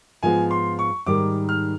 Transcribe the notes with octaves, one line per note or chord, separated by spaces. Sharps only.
G#2 F3 G#3 B3 G#5
C6
C#6
G#2 D#3 G3 D6
F6